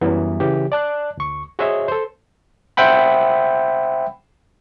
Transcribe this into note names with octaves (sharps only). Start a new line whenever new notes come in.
F#2 E3 F#3 G3 B3 E4
C#3 E3 G4
D5 A5 F#6
D2 C#6
F#4 G#4 C5 C#5 D#5 E5
A4 C5
C5 E5 F#5 G5 B5